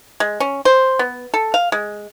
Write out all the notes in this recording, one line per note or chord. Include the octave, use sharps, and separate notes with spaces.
G#3
C#4
C5
B3
A4
F5
G#3